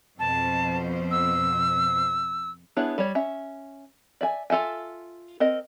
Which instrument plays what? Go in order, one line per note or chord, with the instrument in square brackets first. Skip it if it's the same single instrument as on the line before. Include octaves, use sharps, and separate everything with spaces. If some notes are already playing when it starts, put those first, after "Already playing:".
[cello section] F2 B2 C5 [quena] A5
[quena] E6
[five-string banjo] B3 D4 E4 G#4 C#5
G3 C#5
C#4 E5
D5 E5 G#5
F4 A4 E5 G#5
C4 A#4 D#5